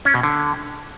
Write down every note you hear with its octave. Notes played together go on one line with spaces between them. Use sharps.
C#4
B2
D3